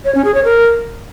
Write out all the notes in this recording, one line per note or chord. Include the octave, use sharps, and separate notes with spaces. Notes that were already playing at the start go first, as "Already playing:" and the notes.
C#5
C#4
G#4
C#5
A#4